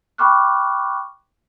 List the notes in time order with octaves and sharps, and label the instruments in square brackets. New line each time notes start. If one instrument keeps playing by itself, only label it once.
[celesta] G5 B5 C#6 D6 F6 F#6